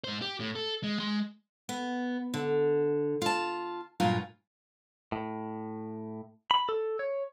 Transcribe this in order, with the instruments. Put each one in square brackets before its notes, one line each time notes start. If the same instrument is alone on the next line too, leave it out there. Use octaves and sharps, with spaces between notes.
[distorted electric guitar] G#2 C5
G4
A2
A4
G#3
G#3 C6
[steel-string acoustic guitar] B3
D3
F4 A5
G2 A#2 F#3 F4 A#4 G#5
[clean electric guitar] A2
B5
A4
C#5